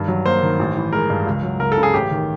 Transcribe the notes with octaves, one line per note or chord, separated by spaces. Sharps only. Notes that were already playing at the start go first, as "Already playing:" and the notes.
Already playing: G2 D#3
F#3
A#3 C5
D#3
A1
E3
G#3 A#4
G2
C#2
F#3
C#2 A#4
A4
C#3
G#4
A1 G4
D#3